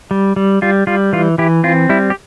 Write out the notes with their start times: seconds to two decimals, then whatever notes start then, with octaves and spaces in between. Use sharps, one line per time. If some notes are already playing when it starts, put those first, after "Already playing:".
0.11 G3
0.36 G3
0.62 G3 F4
0.87 G3 F4
1.13 E3 F4
1.38 E3 E4 G4
1.64 C4 F4
1.89 G3 E4
2.10 G4